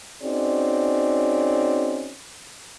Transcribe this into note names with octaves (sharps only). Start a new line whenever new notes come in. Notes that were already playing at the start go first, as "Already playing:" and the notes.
C4 C#4 D#4 F#4 G#4 D5